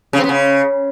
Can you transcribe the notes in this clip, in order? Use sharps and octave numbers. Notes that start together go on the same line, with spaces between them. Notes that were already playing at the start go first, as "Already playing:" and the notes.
C#3
C4
B3
C#3